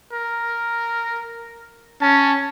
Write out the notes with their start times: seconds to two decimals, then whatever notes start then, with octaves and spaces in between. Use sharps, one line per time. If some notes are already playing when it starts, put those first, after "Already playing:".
0.12 A#4
2.01 C#4 A5